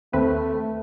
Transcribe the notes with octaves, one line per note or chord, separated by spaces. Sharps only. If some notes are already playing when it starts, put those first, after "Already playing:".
D#2 A3 C4 B4